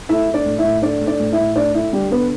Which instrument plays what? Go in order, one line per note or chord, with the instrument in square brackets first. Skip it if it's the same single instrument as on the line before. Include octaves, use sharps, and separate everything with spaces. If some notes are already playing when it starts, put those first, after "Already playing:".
[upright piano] A3 E4 E5
A3
D4 D5
A2
E4 E5
A2
A3 D4 D5
A3
D4 D5
A2
E4 E5
A2
A3 D4 D5
A3 E4
D3 G3 G4
D3 B3 B4